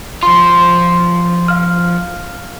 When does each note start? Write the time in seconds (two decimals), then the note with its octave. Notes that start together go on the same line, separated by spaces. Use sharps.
0.23 F3 F4 C6
1.48 F5 F6